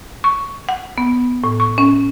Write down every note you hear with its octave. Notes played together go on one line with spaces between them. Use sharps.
C#6
F#5
B3
A2
C#6
C#4